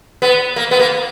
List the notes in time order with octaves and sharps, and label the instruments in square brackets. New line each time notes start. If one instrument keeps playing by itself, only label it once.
[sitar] B3
A#3
B3
A#3